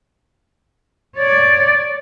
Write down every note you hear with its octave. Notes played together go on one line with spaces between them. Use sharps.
C#5 D5